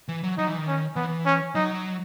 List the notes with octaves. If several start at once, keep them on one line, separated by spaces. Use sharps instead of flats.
E3
F#3
F#3 D#4
E3
D#3
C#4
E3 B3
C#4
F#3 D#4